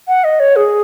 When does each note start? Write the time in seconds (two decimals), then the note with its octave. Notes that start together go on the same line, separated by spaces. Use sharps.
0.08 F#5
0.24 D#5
0.40 C#5
0.56 G#4